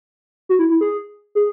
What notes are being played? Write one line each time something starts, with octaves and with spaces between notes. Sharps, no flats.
F#4
E4
E4
G#4
G#4